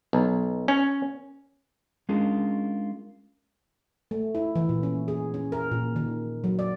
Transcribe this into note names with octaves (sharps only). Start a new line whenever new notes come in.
B1
C#4
G#3 C#4 D4 F4 G#4 A#4
A3
E4
E3
A#2
C#4
G#4
C#4
A#4
A#2
D#3
F#3
D5